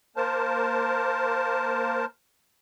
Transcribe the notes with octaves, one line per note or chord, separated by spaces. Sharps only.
A#3 A#4 C5 A5